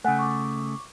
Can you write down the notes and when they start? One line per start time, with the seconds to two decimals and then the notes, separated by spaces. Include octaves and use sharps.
0.04 C#3 A3 F#5 G#5 F#6
0.19 C#6 D6